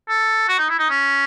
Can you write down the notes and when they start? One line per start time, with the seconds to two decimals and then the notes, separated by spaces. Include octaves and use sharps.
0.09 A4
0.49 F#4
0.59 D#4
0.70 E4
0.79 D#4
0.90 C#4